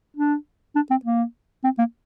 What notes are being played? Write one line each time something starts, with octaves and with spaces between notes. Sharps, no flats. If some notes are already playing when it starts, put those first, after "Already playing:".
D4
D4
C4
A#3
C4
A#3